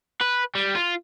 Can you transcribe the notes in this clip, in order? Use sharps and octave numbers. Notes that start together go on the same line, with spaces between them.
B4
G3
F4